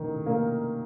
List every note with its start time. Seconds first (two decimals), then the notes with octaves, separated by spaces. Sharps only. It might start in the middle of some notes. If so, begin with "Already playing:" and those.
Already playing: D#3
0.26 A#3